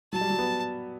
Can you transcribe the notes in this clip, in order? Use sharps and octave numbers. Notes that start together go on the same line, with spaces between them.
F#3 A5
G3
F#3
B3